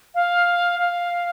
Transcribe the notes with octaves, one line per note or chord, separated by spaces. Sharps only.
F5
F5